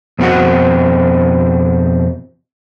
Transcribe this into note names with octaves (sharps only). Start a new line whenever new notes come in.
F2 B2 C4 F4 F#4 F#5